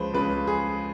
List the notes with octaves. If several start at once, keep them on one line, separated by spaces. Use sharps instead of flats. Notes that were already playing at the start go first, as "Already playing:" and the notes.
Already playing: C#2 C#3 F3 B4 C5
C#2 C#3 F3 B4
G#4